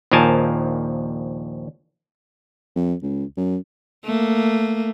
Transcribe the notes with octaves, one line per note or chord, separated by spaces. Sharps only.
A#1 D#2 F3 A#4 G#5 A5
F2
C#2
F#2
A3 A#3